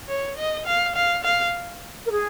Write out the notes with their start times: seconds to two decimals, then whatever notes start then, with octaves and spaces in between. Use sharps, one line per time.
0.09 C#5
0.37 D#5
0.66 F5
0.95 F5
1.24 F5
2.05 A#4
2.10 G#4